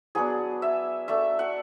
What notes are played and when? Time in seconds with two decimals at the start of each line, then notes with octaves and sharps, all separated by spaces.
0.15 F#3 B3 D4 G#4
0.62 E5
1.08 A3 D4 E5
1.39 F#5